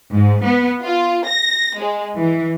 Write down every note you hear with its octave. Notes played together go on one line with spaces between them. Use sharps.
G#2
B3
F4
A#6
G#3
E3